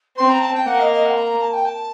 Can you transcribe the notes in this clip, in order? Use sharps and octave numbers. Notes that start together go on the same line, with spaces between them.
C4 C6
A#5
A5
G5
A#3 F#5
D#5
D#5
F#5
C6
A#5
A5
G5
A5